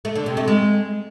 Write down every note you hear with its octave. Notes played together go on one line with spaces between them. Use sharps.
A3
D3
C3
A3
G#3